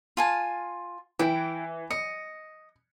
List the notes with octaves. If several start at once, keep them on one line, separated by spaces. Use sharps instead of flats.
F4 G#5 A5
E3 E4 G5
D#5 C#7